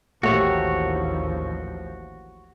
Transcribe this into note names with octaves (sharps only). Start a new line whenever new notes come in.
A1 D#2 F3 A3 A#3 F#4 G4 C#5